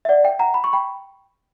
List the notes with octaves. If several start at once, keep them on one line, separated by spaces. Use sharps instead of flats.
E5
D5 F#5
E5 G5
F#5 A#5
B5
C#6
G5 B5